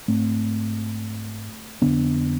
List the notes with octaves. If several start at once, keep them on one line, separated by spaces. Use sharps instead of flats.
G#2 A3 C4
F2 D3 B3 D4